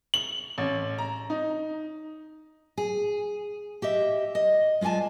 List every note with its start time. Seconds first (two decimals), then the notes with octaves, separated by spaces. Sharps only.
0.14 F#7
0.58 A1
0.98 A#5
1.30 D#4
2.78 G#4
3.82 G4 D#5 E5
4.35 D#5
4.81 G#3 F4 D5 G#5 A5